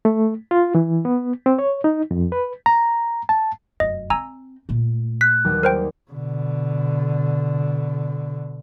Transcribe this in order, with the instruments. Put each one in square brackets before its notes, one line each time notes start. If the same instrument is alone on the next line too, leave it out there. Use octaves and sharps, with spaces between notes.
[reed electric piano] A3
F4
E3
B3
C4
C#5
D#4
F2
B4
A#5
A5
[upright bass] F1 F#2 [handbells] D#5
[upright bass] C4 [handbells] G#5 A#5 E6
[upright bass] A#2 A3
[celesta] F#6 [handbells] B6
[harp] D#2 F#3 G3
[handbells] A#4 C5 G5
[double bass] B2 D3